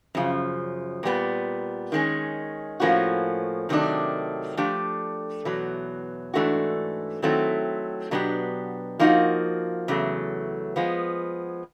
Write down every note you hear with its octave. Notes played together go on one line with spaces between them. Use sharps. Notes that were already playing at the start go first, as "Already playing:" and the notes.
F#2 C#3 F3
A#2 G3 B3
D#3 G#3 C#4
A2 F3 A#3 C#4 F#4
C3 D#3 F#3 A3 D4
F3 A3 D4 G4
E2 B2 F#3
G#2 E3 A3 D4 F#4
D#3 F#3 A3 C4 E4
B2 F#3 B3 D4 G4
F3 A#3 D#4 F#4
E2 C#3 F#3 A3
F3 G#3 B3